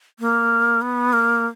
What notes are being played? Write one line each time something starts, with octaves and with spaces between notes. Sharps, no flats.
A#3
B3
A#3